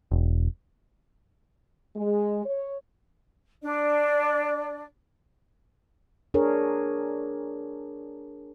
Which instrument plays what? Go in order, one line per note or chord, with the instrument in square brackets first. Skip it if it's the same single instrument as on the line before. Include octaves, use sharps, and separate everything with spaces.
[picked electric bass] E1
[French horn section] G#3
C#5
[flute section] D4 D5
[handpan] D4 G#4 A#4 C#5